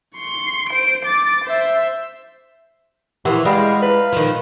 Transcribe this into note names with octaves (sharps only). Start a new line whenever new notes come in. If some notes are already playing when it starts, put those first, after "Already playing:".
C6 C#6
C5 D7
D6 A6
C5 E5
E3 F3 G4 A#4 F#5
G3 G#3 F5 F#5 B5 D#6
E4 B4
D#3 F3